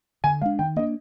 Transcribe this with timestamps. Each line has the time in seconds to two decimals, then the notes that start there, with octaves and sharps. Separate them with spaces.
0.24 D3 G#5
0.41 G#3 D4 F5
0.59 D#3 G5
0.76 A#3 D4 D#5